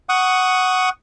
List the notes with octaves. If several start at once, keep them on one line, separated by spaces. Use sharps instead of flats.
F#5 C#6 D#6